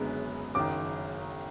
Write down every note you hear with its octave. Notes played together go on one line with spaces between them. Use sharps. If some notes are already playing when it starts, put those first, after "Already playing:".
Already playing: F#1 F#2 D3 G#3 B3
F#1 F#2 D#3 D6